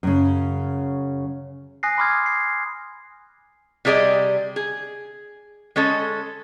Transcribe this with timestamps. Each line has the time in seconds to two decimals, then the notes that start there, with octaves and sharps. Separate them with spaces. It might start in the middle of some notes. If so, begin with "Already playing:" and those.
0.03 F#2 C#3
1.83 G#5 D#6 F#6 A#6 C7
1.98 B5 C6 D6 D#6 F6 G#6
2.26 C7
3.85 C3 G3 G#4 D5 D#5
4.56 G#4
5.76 G#3 C#4 A4 D#5